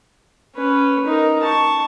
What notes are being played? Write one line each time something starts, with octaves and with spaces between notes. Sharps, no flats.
C#4 B4
D#4 A#4
A5 C#6